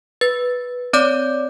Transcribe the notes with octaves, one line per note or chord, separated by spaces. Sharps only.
B4 A6
C4 C#5 D5 D6 G6